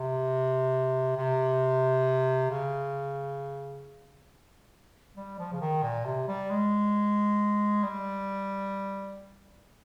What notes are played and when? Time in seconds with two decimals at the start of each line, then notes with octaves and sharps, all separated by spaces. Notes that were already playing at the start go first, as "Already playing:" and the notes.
Already playing: C3
1.17 C3
2.50 C#3
5.16 G3
5.39 F3
5.52 C#3
5.61 D#3
5.83 A#2
6.05 C3
6.28 G3
6.50 G#3
7.83 G3